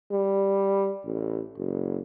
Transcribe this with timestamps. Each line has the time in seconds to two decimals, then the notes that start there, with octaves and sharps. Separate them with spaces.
0.12 G3
1.06 A1
1.58 F#1